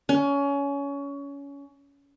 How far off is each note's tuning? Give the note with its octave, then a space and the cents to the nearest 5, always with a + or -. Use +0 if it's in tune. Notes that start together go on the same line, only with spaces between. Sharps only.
C#4 +25